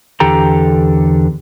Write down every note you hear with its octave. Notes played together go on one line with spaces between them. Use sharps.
E2 D3 G4 A4 G5 A#5